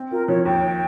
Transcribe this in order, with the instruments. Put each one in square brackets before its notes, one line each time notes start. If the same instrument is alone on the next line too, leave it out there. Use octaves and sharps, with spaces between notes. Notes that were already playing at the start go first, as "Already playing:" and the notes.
Already playing: [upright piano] C4
[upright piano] F4 [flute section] A#4
[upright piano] F3 [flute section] C#5
[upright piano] D#2 [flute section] G5